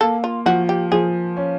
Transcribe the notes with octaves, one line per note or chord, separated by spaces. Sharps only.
A#3 A4
F4
F3 F#4
G4
F3 G#4
C#4